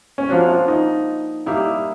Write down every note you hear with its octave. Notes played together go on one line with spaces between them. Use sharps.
C#4
F3 A#3 C4 D4 F#4
F4
D#4
G3 A#3 D#4 E4 G4